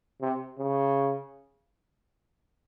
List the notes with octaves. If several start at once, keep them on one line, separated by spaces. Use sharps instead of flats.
C3
C#3